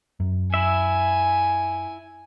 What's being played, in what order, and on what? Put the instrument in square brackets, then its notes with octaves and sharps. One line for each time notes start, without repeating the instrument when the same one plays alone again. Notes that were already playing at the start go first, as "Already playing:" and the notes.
[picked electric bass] F#2
[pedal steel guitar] E4 E5 [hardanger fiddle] G#5